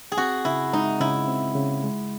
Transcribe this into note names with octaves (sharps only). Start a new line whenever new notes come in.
G#4
C4 F#4
C#3 E4
G#3 D#4
C#3 E4
C4
C#3
G#3